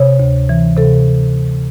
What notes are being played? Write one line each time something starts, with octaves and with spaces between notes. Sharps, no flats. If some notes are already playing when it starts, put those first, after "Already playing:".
Already playing: C3 C#5
D2
E3
C3 A4